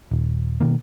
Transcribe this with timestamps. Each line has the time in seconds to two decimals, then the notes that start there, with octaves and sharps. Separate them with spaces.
0.11 D#1
0.60 B2 D#3 A#3